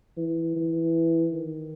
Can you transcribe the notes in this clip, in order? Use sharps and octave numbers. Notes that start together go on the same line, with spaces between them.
E3
E3
D#3